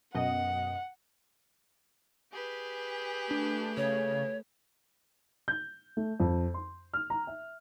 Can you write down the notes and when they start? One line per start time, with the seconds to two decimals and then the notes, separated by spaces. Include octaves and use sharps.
0.15 F#2 B2 D#5 F#5
2.32 G4 G#4 B4
3.31 A3 D4
3.77 C#3 C#5
5.48 G6
5.97 A3
6.20 F2
6.54 C6
6.94 F6
7.10 A#5
7.27 E5